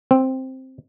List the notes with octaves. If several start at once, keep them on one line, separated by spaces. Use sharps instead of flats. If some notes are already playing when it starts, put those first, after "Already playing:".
C4